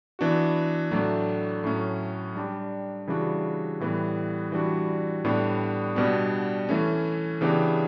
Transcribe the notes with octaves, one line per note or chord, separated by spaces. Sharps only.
E3 B3 D4 F#4
A2 F#3 A3 D4
A2 F#3 A3 C#4
G3 D4 G4
C#3 E3 G3 D4 F#4
A2 E3 G3 B3
E3 G3 D4 F#4
A2 G3 B3 D4
B2 G3 B3 D4
E3 A3 C#4
C#3 E3 B3 D4 G4